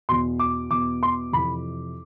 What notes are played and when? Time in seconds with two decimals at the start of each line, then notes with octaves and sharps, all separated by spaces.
0.09 E2 B2 C6
0.39 D6
0.70 E2 B2 D6
1.03 C6
1.33 F2 C3 E3 B5